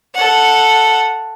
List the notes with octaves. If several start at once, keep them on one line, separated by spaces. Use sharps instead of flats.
A4 F#5